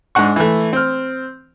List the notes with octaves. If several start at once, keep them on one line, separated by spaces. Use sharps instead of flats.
G#2 G#3 D4 F#5 C#6
E3 A3
C4 F6